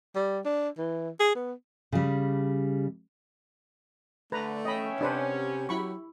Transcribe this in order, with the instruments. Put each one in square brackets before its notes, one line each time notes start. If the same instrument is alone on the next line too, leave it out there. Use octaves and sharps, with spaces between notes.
[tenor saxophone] G3
D4
E3
G#4
B3
[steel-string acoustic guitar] C#3 G3
[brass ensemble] D3 [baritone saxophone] A3 [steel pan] B4 A#5
[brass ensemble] B3 C#4 [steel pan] D#5 B5 [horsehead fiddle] E5 G5
[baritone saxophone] C3 [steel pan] D4 B4 C5
[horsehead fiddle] G4
[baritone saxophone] F#3 [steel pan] E4 B5 C#6